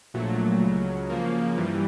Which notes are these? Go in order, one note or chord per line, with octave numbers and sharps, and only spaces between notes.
A#1 A#2 F#3 A3
C#2 C#3 F#3
C#3 F3 A#3
G2 E3 G3